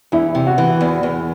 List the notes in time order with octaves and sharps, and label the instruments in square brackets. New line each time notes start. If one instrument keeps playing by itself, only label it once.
[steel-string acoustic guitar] E2 [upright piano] E4
[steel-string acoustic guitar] C3
[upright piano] F#4
[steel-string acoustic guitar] E3
E2
E2